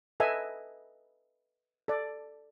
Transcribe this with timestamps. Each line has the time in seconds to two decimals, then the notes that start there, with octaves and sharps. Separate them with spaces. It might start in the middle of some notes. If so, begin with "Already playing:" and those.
0.20 A4 B4 D#5 E5 G#5
1.88 A4 D5